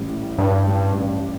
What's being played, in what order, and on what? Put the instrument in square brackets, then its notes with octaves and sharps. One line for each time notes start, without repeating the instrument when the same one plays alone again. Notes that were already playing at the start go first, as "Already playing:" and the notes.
Already playing: [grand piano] A1 G3
A2
[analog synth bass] G2 [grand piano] D4
[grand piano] G3
A1